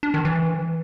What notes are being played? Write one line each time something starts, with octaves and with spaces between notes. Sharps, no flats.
D4
D#3
E3